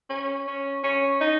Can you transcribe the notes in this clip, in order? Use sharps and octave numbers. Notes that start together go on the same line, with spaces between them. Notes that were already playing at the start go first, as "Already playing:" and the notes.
C#4
C#4
C#4
D#4